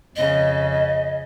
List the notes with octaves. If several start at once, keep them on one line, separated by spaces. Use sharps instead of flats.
F2 C#3 D#5